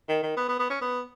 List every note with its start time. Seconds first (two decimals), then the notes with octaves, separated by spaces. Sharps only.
0.09 D#3
0.23 D#3
0.37 B3
0.48 B3
0.59 B3
0.70 C#4
0.82 B3